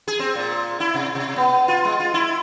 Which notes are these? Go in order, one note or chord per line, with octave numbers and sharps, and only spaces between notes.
G#4
C4
A#2
E4
C3
C3
B3
F4
G#3
F4
E4